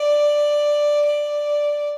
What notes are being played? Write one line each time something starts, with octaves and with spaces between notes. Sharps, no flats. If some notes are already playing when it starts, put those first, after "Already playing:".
Already playing: D5
D5